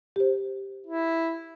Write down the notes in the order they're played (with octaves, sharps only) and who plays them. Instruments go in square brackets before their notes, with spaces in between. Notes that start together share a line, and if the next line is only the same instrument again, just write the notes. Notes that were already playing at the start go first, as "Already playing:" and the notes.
[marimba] G4 C5
[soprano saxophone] E4